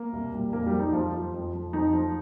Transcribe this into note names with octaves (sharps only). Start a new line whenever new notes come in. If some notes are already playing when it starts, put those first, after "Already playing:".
Already playing: A#3 A#4
C2
A#2 G3
F2 A#3 A#4
G3 G4
F3
D#4
F2 F3 F4
F3
F2
F3
F2 D#4
F3